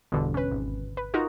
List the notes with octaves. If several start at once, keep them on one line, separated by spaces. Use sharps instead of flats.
G1 E2 B2 D3
C#4 B4
G#1
B4
D#4 F4 F#4 A#4